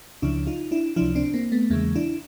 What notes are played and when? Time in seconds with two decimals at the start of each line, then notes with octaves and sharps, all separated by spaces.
0.22 C#2 C#3 F3 D4 E4
0.47 D#4 F4
0.71 D4 E4
0.96 C#2 C3 F3 D4 E4
1.15 C4 D4
1.34 A#3 C4
1.52 A3 B3
1.70 E2 C#3 E3 G#3 A#3
1.96 D4 E4